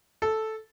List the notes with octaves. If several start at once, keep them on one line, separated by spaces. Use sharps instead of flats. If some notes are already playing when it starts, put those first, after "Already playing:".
A4